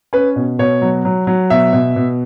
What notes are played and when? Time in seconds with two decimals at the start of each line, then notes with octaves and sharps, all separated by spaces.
0.13 C#4 B4
0.36 B2
0.59 B2 C#5
0.82 F#3
1.05 F#3
1.27 F#3
1.50 B2 E5
1.73 B2
1.96 B2